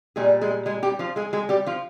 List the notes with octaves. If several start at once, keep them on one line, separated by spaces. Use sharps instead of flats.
A#2 G3 G#3 G#4
G#3 G#4
G#3 G#4
G3 G4
F3 F4
G#3 G#4
G#3 G#4
G3 G4
F3 F4